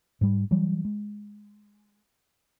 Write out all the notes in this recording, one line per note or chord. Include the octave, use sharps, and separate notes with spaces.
G#2 G3
E3 F#3 G3
G#3